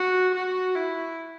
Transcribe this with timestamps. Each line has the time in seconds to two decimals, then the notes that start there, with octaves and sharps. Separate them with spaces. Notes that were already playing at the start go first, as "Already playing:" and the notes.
Already playing: F#4
0.35 F#4
0.76 E4